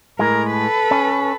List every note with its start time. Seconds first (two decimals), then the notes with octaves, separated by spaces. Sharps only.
0.19 A2 G#3 A#4
0.51 A4 B4
0.91 C#4